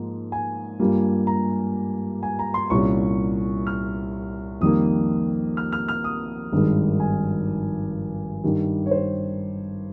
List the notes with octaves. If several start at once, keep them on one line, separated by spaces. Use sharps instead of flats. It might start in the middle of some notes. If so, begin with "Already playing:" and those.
Already playing: G#2 F3 A#3
G#5
G2 G3 A#3 F4
A#5
G#5
A#5
C6
C2 A#2 G3 C#4 C#6
F6
F2 D#3 G3 A#3 D#6
F6
F6
F6
D#6
G#1 G2 D#3 G#3
G#5
G2 D#3 G3
C#5
C5